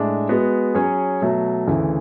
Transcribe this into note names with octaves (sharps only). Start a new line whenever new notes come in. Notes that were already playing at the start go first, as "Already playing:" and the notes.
Already playing: A2 G#3 D4
G#3 B3 F#4
F#3 C#4 G#4 C#5
B2 F#3 A3
D2 C#3 E3